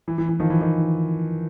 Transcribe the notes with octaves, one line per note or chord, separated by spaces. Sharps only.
E3
E3
E3
D#3 F3
E3
D#3